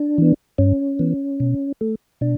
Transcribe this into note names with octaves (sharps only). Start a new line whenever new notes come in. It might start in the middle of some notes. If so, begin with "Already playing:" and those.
Already playing: D4
E3 B3
G2 C#4
E3 B3
B2
A3
B2 D4